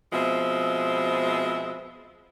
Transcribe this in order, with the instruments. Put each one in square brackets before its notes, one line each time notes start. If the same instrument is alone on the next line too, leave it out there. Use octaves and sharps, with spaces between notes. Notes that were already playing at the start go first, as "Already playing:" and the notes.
[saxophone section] B2 F3 G#3 C4 E5